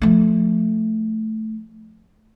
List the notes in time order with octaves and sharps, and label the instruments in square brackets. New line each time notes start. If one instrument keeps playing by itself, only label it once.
[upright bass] F3 A3